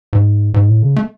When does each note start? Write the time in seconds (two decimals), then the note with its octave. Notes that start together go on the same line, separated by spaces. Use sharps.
0.13 G#2
0.54 G#2
0.68 A2
0.82 C#3
0.96 A3